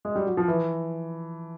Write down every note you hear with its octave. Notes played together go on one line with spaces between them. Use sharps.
G#3
G3
F#3
F3
E3